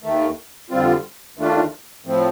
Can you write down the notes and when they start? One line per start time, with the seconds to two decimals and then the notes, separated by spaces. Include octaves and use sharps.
0.03 D#2 D#3 A3
0.70 F2 D3 G3 C4 F4
1.37 D#2 D#3 A3 D4 F4
2.05 A2 F3 C4